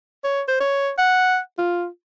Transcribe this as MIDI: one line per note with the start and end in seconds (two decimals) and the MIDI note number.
0.24 0.42 73
0.48 0.56 72
0.61 0.90 73
0.99 1.38 78
1.58 1.87 65